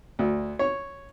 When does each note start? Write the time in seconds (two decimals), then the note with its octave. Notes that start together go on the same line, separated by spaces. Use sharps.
0.19 D2
0.59 C#5